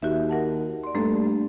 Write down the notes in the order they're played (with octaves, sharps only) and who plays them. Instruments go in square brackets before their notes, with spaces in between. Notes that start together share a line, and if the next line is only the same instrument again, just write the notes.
[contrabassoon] D#2 [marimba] F#4 G4 E5
[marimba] A#4 F#5 A5
D5 C6
[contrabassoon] G2 [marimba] A3 A#3 A4